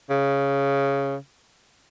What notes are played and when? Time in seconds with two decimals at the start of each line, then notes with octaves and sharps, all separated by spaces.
0.10 C#3